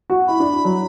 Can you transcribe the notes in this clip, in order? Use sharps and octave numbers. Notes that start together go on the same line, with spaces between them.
F#4
E4 B5
D4
F#3